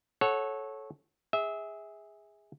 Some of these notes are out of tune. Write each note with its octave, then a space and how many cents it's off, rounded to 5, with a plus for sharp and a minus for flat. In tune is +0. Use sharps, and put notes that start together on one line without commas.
A4 -20 C#5 -15 F#5 +0
G#4 -15 E5 -25